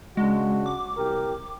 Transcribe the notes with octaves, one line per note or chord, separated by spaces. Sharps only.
C#3 G#3 D4 F#4
D6
C2 G4 A#4